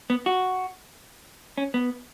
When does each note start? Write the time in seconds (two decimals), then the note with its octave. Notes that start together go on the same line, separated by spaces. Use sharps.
0.10 B3
0.26 F#4
1.58 C#4
1.74 B3